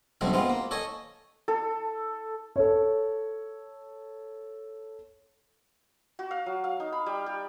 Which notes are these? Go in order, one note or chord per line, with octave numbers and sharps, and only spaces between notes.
D2 G2 B2 F#3 A3 C4
G#3 B3 C4 F4
A#3
A4 C#5 D#5 G#5
A4
A4 C#5
F#4
F5
F#3
F5
D#4
B5
G3
G4